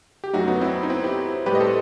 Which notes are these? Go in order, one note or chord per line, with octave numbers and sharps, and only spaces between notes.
G4
F#2 F#3 A3 D#4 F#4
B3 D#4
C4 E4
D#4
C4 E4
E4 G4
A2 G3 G4 B4
D#5
A4 C5